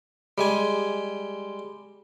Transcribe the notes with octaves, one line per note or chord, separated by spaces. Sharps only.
G3 G#3 G#5